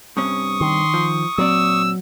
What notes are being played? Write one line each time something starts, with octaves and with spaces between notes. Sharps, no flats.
G2 C3 C#4 C#6 D#6
D#3 C6
F3
A#2 F#3 C4 D5 E6